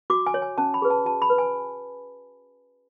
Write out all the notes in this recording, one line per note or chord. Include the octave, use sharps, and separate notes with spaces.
F#4 D6
G#5
C#5
G#5
C#4 A5
B5
G#4 B4
A5
F#4 A5
B5
B4
G#5